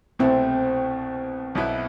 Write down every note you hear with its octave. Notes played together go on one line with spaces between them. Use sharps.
C2 B2 A3 C4 E4
B1 B2 B3 E4